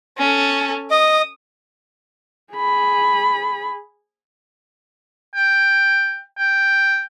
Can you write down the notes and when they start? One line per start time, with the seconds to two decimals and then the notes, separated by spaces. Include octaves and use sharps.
0.18 C#4 A4
0.91 D#5 D#6
2.53 G#4 B5
5.35 G5
6.38 G5